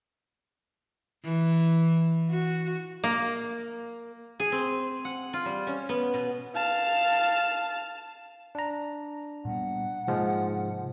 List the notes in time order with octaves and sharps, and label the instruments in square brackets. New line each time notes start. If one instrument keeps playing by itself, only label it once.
[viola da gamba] E3
F#4
[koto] A#3
G#4
C4
F#5
F4
G3
C#4
B3
B2
[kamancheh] F5 A5
[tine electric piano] D4 A#5
[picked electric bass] A#2 G3 B3 [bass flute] F#5
[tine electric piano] G#2 F3 G#3 [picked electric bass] C3 A#3